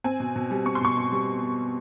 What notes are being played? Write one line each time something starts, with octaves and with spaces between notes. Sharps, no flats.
C4 G#5
B2
B2
G3
C4 C#6
C6
B2 C#6
B2
G3